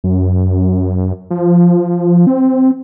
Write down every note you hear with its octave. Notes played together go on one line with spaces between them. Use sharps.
F#2
F3
C4